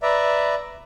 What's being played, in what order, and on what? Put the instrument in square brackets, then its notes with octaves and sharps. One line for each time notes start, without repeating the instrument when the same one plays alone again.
[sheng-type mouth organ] B4 D5 E5 A#5